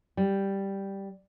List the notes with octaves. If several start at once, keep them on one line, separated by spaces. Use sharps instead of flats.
G3